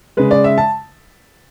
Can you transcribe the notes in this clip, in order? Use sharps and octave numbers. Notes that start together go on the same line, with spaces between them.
C#3 G#3 B4
D5
E5
A5